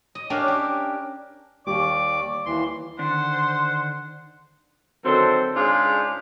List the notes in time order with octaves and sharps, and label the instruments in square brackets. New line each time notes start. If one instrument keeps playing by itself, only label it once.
[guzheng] D#5
C#4 D4 G4 A#4 F5
G4
[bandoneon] D#2 D6 [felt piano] G3 [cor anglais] D5 [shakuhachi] C#6
[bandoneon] D#2 E3 C6 [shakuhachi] E4
[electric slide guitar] D3 D#3 D4 [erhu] C5 [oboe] F#5
[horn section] D3 D#3 F#3 C4 A4 C5
G#2 C#3 D4 F4 G#4